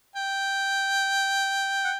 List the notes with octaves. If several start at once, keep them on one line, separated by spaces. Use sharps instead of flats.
G5
F#5